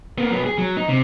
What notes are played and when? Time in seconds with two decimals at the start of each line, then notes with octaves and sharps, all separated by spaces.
0.18 A#3 B3
0.31 F#3 B3
0.46 G#4
0.58 F#3
0.77 D#4
0.89 C3